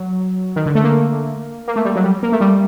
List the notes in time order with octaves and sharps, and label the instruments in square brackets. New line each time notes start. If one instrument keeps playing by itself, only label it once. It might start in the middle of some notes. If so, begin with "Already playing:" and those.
Already playing: [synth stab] F#3
D#3
D3
A3
A#3
A#3
A3
G3
F#3
G3
A#3
A3
G3